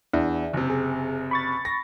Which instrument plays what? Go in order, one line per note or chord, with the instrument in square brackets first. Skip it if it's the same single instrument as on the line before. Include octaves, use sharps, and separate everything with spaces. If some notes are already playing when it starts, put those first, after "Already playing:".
[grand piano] E2 [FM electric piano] D4 E4
[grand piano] F#1 C3
[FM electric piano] G#4
B5 C#6 A6
[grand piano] A#6